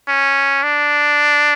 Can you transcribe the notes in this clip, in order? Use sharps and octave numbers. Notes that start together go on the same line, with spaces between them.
C#4
D4